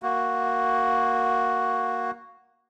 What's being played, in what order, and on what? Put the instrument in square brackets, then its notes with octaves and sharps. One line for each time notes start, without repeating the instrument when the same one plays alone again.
[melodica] A#3 F#4